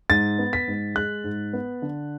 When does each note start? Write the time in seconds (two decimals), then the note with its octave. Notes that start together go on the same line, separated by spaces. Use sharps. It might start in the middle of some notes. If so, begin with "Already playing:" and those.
0.10 G#2 A6
0.39 B3
0.53 B6
0.68 G#2
0.95 G#3 F#6
1.24 G#2
1.53 B3
1.82 D3